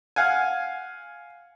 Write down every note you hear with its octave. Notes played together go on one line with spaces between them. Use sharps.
F5 F#5 G#5